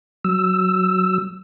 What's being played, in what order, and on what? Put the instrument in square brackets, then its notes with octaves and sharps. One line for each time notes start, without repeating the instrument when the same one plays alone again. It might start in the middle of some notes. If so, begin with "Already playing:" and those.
[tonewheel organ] F#3 E6